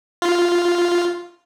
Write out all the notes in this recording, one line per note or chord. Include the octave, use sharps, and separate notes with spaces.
F4